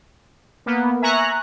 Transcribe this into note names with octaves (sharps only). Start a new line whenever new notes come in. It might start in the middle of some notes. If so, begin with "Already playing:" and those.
A#3 B3
E5 G#5 A#5 C#6 F#6